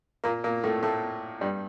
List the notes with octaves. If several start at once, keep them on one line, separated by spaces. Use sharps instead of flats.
A#2 A#3
A#2 A#3
A2 A3
A2 A3
G2 G3